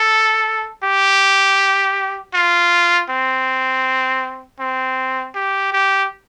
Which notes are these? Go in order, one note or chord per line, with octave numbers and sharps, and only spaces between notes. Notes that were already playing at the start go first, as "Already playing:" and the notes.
Already playing: A4
G4
F4
C4
C4
G4
G4